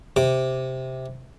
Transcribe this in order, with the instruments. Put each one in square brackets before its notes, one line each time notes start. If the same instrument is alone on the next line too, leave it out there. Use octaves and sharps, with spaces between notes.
[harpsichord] C3 D6